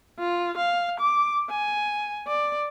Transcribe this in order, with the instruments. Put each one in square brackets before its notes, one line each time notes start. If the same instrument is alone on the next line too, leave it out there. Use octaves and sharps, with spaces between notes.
[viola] F4
F5
D6
G#5
D5